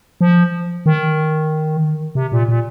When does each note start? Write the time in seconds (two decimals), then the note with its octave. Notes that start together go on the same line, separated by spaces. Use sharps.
0.21 F3
0.86 D#3
2.15 C3
2.32 A#2
2.48 A#2